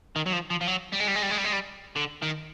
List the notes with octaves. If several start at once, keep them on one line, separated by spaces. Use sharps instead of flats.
D#3
F#3
F3
F3
F3
F#3
G3
G#3
G3
G#3
G3
G#3
G3
G#3
G3
D3
D#3